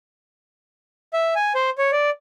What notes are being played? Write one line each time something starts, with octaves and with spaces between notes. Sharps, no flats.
E5
G#5
C5
C#5
D5